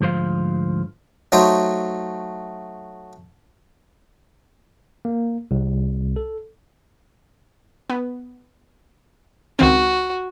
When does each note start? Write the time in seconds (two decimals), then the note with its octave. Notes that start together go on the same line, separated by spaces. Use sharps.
0.01 D2 G#2 F3 C5 F5
1.32 F#3 A3 D#4 C5 C#5
5.05 A#3
5.51 C2
6.16 A4
7.90 B3
9.59 C#2 D#3 C4 F#4